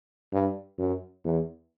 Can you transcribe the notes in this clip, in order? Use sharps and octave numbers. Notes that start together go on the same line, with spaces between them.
G2
F#2
E2